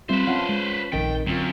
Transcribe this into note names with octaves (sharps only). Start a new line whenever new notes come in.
G3 C4 F4 B4 C5 E5
C#4 F4 F5 F#5 A5
G#3
A#1 F2 D#3 G5 A6
F#2 D3 C4 F4